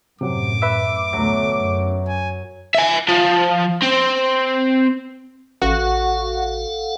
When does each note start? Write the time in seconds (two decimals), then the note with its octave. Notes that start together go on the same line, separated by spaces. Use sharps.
0.21 F#2 A2 C3 F#3 D6
0.62 B4 E5 E6
1.13 D2 B2 F#3 A3
1.56 F#2
2.08 G#5
2.75 E5 G#5
3.08 F3
3.82 C4
5.62 A1 F#4 A4 F5 F#5